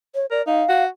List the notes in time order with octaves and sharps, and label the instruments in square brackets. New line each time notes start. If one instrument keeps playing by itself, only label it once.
[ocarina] C#5
[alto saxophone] A#4 [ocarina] D5
[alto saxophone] D#4 [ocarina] F5
[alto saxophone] F#4